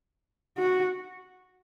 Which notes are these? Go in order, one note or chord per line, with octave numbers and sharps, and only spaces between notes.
F#4